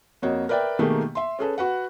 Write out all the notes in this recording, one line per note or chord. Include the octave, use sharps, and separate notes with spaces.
F2 A#3 F#4 C#5 D#5
A#4 B4 D5 E5 G5
B2 D#3 A3 A#3 G4 G#4
E5 C6
C#4 G#4 A4 B4
F#4 B4 F#5